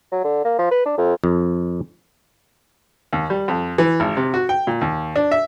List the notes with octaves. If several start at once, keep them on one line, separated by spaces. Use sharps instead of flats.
F#3
D3
A#3
F3
B4
D4
F2
F2
D#2
G3
F2
E3
G#1
C3
F#4
G5
A#2
D#2
D4
E5